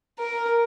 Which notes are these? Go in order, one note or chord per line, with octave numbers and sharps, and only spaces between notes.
A#4